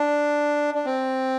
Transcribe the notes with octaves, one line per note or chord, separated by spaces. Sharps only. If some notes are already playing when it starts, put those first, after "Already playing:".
Already playing: D4
D4
C4